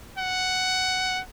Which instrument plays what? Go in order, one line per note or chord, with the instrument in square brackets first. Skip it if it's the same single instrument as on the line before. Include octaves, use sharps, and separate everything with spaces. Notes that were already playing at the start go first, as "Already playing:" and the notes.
[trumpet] F#5